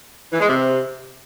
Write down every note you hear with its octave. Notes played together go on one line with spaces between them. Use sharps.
E3
G#3
C3